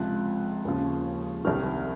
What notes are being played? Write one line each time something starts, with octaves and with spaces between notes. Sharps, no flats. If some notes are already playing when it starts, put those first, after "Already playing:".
Already playing: C#2 C3 F3 F#6
D#2 C#3 F3
C2 C3 D#3 F6